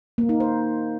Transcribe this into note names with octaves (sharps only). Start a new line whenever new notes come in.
A#3
D#4
C5